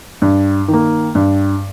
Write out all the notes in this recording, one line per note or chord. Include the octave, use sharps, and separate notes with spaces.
G2
D#3
A#3
G2